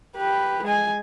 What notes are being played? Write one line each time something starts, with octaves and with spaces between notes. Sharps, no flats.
G4 B4
G#3 G#5